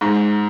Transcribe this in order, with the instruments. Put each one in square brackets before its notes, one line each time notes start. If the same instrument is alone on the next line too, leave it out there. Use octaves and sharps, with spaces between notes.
[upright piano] G#2